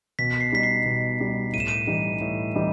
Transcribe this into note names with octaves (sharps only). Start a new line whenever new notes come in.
B2 B6
C7
G3 D#4 B6
C7
B2
G3 D#4
A2 D#7
E7
D#7
E3 G3 D#4
A2
E3 G3 D#4